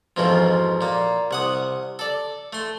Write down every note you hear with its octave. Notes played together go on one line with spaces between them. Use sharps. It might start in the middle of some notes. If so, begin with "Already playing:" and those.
F2 G#2 B2 E3 F3
A#2 A#3
C2 F#5 D#6
A4 D5
A3 C6